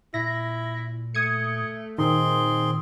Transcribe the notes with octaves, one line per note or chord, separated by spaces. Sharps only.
A#2 E4 A#6
A3 D#6 G#6 C#7
A#2 D#3 C4 D#4 G#4 C6